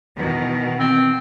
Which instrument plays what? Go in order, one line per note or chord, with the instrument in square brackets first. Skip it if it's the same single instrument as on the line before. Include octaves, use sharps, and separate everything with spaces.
[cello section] B2 D#3 E3
[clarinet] C4